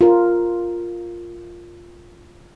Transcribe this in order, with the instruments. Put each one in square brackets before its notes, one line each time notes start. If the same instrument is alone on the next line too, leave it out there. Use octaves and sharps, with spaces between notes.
[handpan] F4 A#4